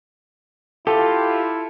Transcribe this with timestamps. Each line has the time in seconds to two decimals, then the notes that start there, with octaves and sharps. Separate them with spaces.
0.87 E4 F4 G4 A4